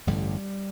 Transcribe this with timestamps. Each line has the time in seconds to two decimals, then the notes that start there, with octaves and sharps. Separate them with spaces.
0.07 A1 G2 D3 G3